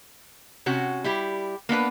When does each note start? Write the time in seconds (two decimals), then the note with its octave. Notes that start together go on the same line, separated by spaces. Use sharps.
0.66 C3 C#4 F#4
1.04 G3 E4 G4
1.69 A#3 B3 D4 B4